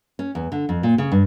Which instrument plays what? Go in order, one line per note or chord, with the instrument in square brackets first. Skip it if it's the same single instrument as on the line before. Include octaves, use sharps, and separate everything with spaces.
[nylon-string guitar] C#4
E2
D3
F2
A#2
C#3
G2